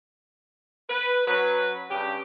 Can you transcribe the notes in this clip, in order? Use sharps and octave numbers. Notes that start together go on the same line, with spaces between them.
B4
F#3 C#4 B4
G2 C#3 G4